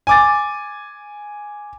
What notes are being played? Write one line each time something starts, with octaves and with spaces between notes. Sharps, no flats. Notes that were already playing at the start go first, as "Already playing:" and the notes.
G#5 D6 A6